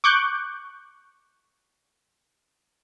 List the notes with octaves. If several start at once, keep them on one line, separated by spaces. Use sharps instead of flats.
C#6 D6 F#6 G6